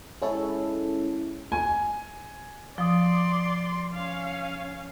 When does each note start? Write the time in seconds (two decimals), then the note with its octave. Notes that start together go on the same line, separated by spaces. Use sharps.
0.22 G#3 C#4 E4 A4
1.52 G#5
2.78 F3 D5 C6 D#6
3.93 C#4 F5